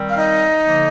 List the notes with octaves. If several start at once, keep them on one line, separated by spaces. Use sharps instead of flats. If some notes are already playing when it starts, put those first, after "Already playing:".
Already playing: D#3 G3 C4
F5
D#4 D#5
D3 F3 A#3